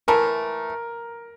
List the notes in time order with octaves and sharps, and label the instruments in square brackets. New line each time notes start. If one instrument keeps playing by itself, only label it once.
[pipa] E3 A3 E4 A4 [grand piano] A#4